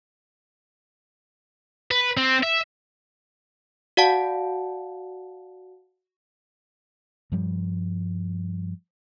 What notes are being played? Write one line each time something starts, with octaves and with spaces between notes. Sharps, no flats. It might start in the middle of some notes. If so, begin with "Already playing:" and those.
B4
C4
E5
F#4 D5 F5 F#5 A5
G2 F3 G3